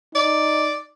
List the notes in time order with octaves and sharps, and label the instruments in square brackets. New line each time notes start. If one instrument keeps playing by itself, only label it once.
[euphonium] D#4 [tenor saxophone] D5